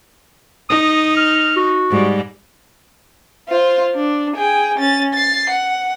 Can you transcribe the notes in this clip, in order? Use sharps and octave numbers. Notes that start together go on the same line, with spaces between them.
D#4 D#6
F6
F#4
G#2 G3
F4 C5
D4
G#4 G5
C#4 A6
A6 C7
F#5